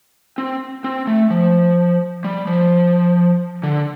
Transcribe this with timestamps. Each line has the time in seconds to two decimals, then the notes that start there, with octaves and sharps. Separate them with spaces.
0.38 C4
0.84 C4
1.07 A3
1.30 F3
2.24 G3
2.47 F3
3.63 D3